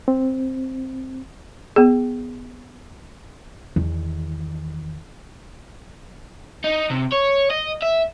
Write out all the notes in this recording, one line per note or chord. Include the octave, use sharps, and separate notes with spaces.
C4
B3 G#4
E2 D#3
D#4
C3
C#5
D#5
E5